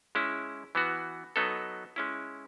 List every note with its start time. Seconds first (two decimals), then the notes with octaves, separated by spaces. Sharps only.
0.15 G#3 C#4 E4
0.75 E3 B3 F#4
1.36 F#3 B3 D#4 A4
1.96 G#3 C#4 E4